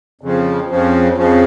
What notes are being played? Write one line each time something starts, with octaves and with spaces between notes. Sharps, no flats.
F2 C#3 F3
F2 C#3 F3
F2 C#3 F3